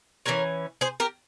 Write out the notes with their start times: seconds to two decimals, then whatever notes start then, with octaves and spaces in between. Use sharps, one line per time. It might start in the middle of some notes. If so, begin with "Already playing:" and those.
0.26 E3 A#3 C#4 A#4 C#5
0.81 G#4 C5
1.00 G4 A#4